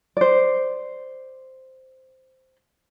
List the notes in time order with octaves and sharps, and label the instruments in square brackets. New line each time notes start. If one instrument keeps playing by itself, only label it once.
[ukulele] C5 D5